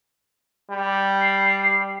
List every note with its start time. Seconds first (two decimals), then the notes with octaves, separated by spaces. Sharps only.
0.70 G3
1.22 C7